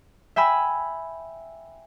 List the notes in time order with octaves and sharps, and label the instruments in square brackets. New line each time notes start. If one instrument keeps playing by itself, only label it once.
[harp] E5 G5 G#5 B5 E6